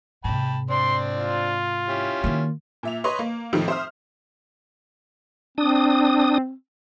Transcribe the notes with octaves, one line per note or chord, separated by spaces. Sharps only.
G#2 C3 G5 A5 B5
C4 D4 D5 C6
F4
C#4 E4 G4
D#3 A#3
A#2 E5 F7
B4 C#5 D#5 C6
A#3
F2 A2 D#3 F3 C4 D#4
C5 E5 C6 D#6 F6
C4 D4 D#6